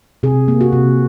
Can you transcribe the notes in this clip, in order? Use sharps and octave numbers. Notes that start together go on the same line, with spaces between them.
C3 G#4
A#3
F#4
C3